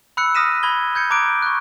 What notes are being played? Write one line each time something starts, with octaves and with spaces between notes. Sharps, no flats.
B5 E6 F#6 C#7
D#6 F6 A#6 B6 D#7 E7
B5 G#6 G7
G6 G#6 C#7
A#5 D6 F#6 D7
C#6 F#6